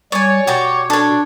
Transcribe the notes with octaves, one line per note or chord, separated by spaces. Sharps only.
G3 C#5 D5 G#5
B2 F#4 G4 D5
D4 A4 C#5